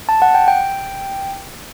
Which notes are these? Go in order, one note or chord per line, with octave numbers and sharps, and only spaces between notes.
A5
F#5
G5
G5